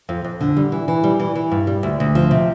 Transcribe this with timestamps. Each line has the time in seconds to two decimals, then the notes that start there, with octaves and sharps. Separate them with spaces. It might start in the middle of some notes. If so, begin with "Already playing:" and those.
0.09 F2
0.24 F2
0.41 D3
0.57 G3
0.72 E3
0.88 E3
1.04 G3
1.20 E3
1.35 E3
1.52 G2
1.67 G3
1.83 D2
2.00 D2
2.15 F3
2.31 C3